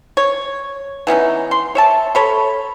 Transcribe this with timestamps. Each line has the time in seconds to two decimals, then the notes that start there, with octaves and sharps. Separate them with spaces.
0.17 C#5
1.07 E3 B3 C#4 D#4
1.51 C6
1.75 C#5 E5 A5
2.15 A4 C#5 B5